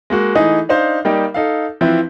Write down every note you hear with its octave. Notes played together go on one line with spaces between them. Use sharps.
G#3 A#3 F#4
E3 A3 D#4 G#4 D#5
D4 D#4 C5 F5
G3 A#3 D#4 G4
D#4 A4 F5
E3 F3 C4 E4 B4